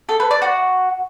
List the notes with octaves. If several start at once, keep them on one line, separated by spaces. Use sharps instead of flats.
A4
B4
D5
F#4